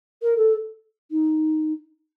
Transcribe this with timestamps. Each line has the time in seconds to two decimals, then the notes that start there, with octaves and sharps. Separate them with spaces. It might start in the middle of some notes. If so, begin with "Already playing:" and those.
0.22 A#4
0.37 A4
1.11 D#4